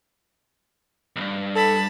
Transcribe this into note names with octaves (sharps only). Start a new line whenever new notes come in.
B1 G2
A4 A5 B5